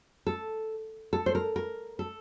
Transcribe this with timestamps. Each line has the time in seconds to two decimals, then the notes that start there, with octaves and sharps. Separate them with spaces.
0.27 A4
1.13 A4
1.26 C5
1.35 A#4
1.56 A#4
1.99 A4